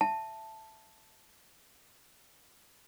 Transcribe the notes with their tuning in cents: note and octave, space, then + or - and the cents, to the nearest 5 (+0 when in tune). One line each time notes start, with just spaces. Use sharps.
E5 +15 A5 +0